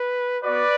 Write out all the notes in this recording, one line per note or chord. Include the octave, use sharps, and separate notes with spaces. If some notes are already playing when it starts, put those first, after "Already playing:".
Already playing: B4
B3 F#4 B4 D5